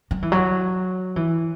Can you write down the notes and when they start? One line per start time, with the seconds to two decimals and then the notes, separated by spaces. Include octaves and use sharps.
0.11 F#3
0.22 E3
0.32 F#3
1.16 E3